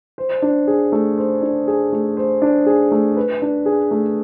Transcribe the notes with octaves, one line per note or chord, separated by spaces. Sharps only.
C5
D4
G#4
A3
C5
D4
G#4
A3
C5
D4
G#4
A3
B4
D4
G#4
A3